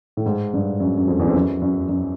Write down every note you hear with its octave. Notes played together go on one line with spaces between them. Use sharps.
A2
G#2
G2
F#2
F#2
F2
E2
F2
F#2
F#2
F#2